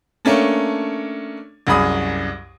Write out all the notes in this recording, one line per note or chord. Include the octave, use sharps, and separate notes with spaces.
A3 A#3 C#4 D4
C2 F#2 G#4 B5 D#6